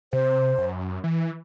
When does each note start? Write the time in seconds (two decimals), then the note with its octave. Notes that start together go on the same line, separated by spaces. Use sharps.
0.13 C3 C5
0.58 F#2
1.04 E3